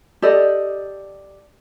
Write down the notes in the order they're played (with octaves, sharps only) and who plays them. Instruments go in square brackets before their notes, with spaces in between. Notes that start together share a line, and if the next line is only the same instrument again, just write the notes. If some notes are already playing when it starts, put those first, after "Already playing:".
[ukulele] G4 A4 D5 D#5